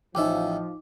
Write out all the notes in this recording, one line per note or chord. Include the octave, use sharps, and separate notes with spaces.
A1 F3 C#4 D#4 D#5 E5 G5 D6